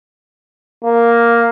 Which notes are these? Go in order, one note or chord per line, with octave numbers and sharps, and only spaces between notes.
A#3